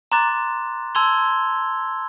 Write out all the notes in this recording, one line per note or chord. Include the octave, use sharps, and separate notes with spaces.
A#5 C6 D6 F#6 A6
A5 C6 E6 G#6 F7 G7